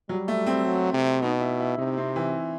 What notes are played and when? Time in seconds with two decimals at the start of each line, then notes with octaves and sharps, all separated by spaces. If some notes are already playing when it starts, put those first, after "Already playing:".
0.09 F#3 G3
0.28 A3
0.46 C4
0.65 F#3
0.94 C3
1.22 B2 D#4
1.41 E4
1.60 E4
1.78 C3 D#4
1.97 C4
2.16 E3